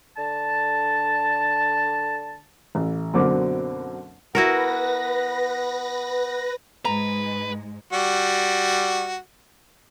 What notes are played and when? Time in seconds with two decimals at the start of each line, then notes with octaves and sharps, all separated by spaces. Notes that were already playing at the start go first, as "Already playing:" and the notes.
0.16 D3 A5
2.75 A1
3.14 F#2 B2 D3 A#3 C4 D6
4.35 B3 E4 F#4 A#4 B4 A#6
6.85 G#2 G#3 B4 A#5
7.93 G3 F#4